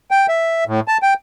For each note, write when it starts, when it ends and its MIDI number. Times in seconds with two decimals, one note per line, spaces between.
0.11 0.26 79
0.29 0.64 76
0.67 0.80 45
0.88 0.97 81
1.03 1.14 79